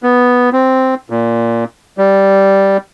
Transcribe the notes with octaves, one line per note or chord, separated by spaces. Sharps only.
B3
C4
A#2
G3